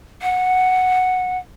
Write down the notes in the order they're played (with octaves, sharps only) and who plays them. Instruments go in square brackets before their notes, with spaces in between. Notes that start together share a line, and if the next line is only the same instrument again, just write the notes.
[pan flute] F#5